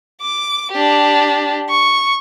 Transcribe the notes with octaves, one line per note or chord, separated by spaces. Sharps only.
D6
D4 G4
C#6